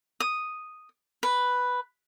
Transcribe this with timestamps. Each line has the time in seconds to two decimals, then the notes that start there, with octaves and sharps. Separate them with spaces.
0.20 D#6
1.23 B4